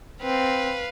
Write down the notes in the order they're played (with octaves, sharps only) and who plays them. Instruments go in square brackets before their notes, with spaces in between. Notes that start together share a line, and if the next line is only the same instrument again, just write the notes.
[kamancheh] C4 [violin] B4 F5